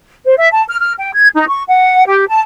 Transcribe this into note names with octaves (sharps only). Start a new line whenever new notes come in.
C5
E5
A5
F6
F6
G5
G#6
D#4
C#6
F#5
G4
A5